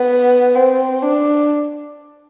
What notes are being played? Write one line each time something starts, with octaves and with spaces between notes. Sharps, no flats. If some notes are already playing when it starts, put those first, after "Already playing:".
Already playing: B3
C4
D4